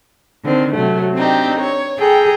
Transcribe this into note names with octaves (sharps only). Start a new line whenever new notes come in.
D3 D#3 C4
C3 F#3 A3
C4 D4 D#4 G4
C#5
G#4 A4 G5 A#5